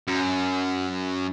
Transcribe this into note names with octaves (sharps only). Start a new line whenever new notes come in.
F#2